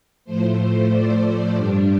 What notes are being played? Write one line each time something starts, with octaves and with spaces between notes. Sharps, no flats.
A2 F3 A3 C5
D5
G2 G3 D4